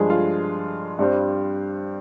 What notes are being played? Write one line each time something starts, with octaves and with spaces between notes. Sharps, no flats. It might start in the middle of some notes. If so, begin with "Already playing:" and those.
Already playing: G2 F3 G#3 G#4
F4
G2 G3 C4